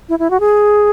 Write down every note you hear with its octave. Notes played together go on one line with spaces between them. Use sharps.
E4
E4
F#4
G#4